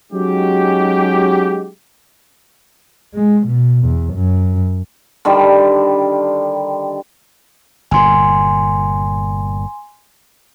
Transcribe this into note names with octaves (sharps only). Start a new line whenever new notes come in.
F#3 G#3 C#4 D#4 F#4 G4
G#3
B2
E2
F#2
D3 D#3 G3
G1 A#2 G#5 C6